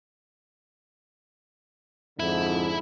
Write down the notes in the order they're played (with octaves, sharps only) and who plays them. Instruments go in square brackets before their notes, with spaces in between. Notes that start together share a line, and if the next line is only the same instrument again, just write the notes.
[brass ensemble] F2 G#2 D3 [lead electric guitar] E4 E5